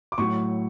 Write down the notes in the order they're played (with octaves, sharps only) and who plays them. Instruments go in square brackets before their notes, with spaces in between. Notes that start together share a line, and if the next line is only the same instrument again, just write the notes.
[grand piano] D6
A2 F#3 C#6